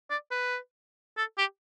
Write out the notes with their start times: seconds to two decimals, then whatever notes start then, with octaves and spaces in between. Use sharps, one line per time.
0.10 D5
0.31 B4
1.17 A4
1.38 G4